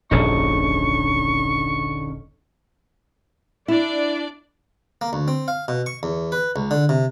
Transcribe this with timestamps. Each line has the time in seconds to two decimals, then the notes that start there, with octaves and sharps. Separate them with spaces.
0.11 D#1 A#1 F#2 D3 C#4 D#4 C#6
3.68 D4 E4 D5
5.01 A#3
5.13 D2
5.28 C4
5.48 F5
5.68 B2
5.86 C#6
6.03 E2
6.32 B4
6.56 C#2
6.71 D3
6.89 C3